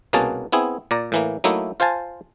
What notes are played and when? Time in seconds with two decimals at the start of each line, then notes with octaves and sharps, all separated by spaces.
0.13 C2 B2 A#3 C#4 G#4 A5
0.52 B3 C4 E4 G#4
0.91 A#2 D5 A#5
1.12 A2 E3 A#3
1.44 F#3 A3 A#3 D#4 E4
1.80 F4 C5 F5 G#5 A5